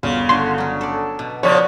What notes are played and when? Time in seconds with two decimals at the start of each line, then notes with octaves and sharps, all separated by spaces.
0.03 G1 C#3 F4
0.29 D3 F#4 C#5 C6
0.58 F#3 C#4
0.81 A4 D5
1.19 B2
1.43 C#3 F3 C#4 F#4 C#5 D5